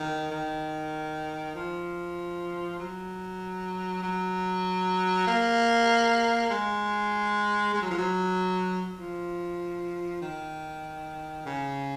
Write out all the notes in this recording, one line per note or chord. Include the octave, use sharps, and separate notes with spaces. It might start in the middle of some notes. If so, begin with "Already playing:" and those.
Already playing: D#3
D#3
F3
F#3
F#3
A#3
G#3
G#3
F#3
F3
F#3
F3
D#3
C#3